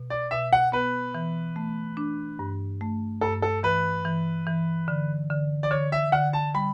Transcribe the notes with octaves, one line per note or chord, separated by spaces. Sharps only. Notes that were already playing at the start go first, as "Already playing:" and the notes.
Already playing: B2
D5
B2 E5
F#5
B3 B4
E3
A3
D4
G2
A3
G2 A4
A4
E3 B4
E3
E3
D3
D3
D5
D3 C#5
E5
D3 F#5
A5
G3 B5